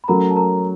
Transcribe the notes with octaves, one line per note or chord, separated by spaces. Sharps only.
B5
F#3 A3 C#4 A#4 A#5
A5
A#4 A#5